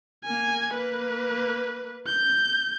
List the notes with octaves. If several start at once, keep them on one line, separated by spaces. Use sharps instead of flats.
A#3 G#5
A#3 B4
G6